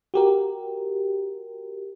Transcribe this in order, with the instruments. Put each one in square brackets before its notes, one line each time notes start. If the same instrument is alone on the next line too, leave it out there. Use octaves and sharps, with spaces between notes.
[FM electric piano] F#4 G4 A#4